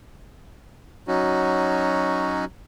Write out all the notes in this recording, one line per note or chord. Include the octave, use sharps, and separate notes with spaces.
F#3 C#4 D#4 F#4